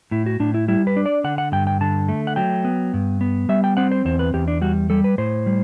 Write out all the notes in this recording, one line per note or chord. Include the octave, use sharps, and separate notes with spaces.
A2 E4
F#4
A2 D4
E4
G3 E4
B4
D4
D5
D3 F#5
F#5
G2 G5
G5
D3 A5
A3
F#5
F#3 G5
B3
G2
B3
G3 E5
G5
C4 F#5
C5
E2 C5
B4
E2 G4
D4
G3 F#4
G3 A4
B4
A2 C5
G3